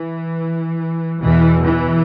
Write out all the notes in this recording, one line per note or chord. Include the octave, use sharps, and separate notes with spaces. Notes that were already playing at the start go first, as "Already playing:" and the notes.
Already playing: E3
E2 B2 E3
E3